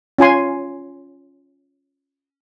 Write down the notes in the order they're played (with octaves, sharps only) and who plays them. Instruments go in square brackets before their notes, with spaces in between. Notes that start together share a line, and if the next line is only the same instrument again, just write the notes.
[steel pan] C#4 F4 G#5 C6